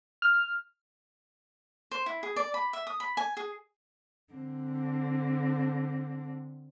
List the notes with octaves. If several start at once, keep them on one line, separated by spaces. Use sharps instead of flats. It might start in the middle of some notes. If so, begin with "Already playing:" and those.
F6
C5
E4
G#4
D5
B5
E5
D#6
B5
G#5
G#4
D3 C4